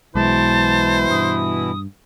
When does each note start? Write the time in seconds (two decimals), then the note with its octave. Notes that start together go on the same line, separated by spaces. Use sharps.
0.15 B1 B2 E3 G#3 E4 C5 A5
1.11 G2 D#6